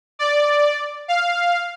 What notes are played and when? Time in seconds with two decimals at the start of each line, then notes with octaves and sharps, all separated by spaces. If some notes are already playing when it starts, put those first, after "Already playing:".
0.19 D5
1.08 F5